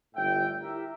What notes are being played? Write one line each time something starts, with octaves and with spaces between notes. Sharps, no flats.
G1 A2 E5 G5
E4 G4 A#4 E5